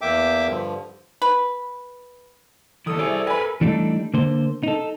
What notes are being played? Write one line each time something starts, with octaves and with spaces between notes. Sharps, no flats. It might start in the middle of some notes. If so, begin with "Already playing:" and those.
E2 A#3 E5 G5 D6
G2 D3 F3
B4
D#2 E3 A4 D#6
G3 E4 G#4 C5 D5
A#4 B4 G#5 B5
E3 G3 A3 D4 D#4 A4
D3 A#3 C5
D#4 A4